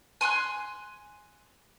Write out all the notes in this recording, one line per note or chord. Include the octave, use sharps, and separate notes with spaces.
G#5 C6 E6 F#6